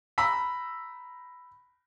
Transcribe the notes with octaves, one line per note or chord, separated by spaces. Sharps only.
A#5 B5 E6 B6